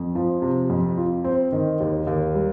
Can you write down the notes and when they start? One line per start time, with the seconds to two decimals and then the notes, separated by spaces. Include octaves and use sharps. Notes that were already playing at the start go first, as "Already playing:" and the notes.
Already playing: F2
0.15 F3
0.42 C3
0.70 F2
0.98 F4
1.24 C4
1.52 D#3
1.80 D#2
2.07 D#2
2.35 G3